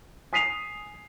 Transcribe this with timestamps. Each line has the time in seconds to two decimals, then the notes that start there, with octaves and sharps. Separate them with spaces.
0.33 G#5 D#6 B6 C7 D#7 F7